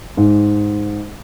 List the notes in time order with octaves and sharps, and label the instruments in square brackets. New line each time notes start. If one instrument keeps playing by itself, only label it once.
[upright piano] G#2